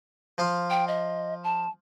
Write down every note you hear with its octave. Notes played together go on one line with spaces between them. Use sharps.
F3 F4 F5
G5
D#5
A5